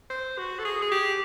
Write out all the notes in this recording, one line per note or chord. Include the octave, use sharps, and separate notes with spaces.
C5
F#4
A4
G#4
G#4
G4